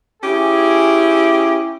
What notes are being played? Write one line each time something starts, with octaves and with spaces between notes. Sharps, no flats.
C#4 E4 G4 G#4